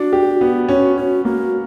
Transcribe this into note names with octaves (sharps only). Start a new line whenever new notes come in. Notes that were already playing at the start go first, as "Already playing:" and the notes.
Already playing: D4 F#4
G4
B3
C#4 F#4
C#4 F#4
A#3 F#4